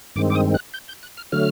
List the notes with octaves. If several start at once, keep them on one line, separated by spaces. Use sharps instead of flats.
G2 D#3 G#3 C4 D6
D6
D#6
F#6
G6
G6
F#6
F6
D3 F#3 A3 F6